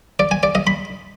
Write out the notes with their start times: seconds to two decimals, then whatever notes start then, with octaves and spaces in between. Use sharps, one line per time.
0.19 D5
0.31 G#5
0.43 D5
0.55 D#5
0.67 B5